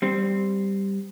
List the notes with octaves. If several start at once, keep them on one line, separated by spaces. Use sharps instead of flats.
G3 C4